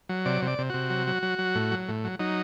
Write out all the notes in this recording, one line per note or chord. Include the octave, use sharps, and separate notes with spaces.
F#3
C3 D5
C3
D5
C3
C3 F#4
F#3
F#3
F#3
F#3
A2
F#3
A2
F#3
F#3 D#4